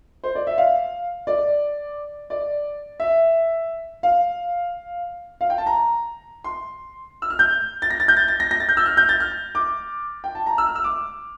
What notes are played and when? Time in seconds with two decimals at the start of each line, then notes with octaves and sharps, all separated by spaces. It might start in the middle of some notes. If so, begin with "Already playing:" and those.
0.24 C5
0.35 D5
0.47 E5
0.58 F5
1.27 D5
2.30 D5
3.00 E5
4.03 F5
5.41 F5
5.50 G5
5.58 A5
5.66 A#5
6.44 C6
7.22 E6
7.30 F6
7.39 G6
7.82 A6
7.90 A#6
8.00 A6
8.08 G6
8.17 A6
8.28 A6
8.40 A#6
8.51 A#6
8.60 A6
8.69 G6
8.77 E6
8.86 F6
8.97 G6
9.09 A6
9.20 F6
9.55 D6
10.24 G5
10.35 A5
10.46 A#5
10.58 E6
10.67 F6
10.76 E6
10.84 D6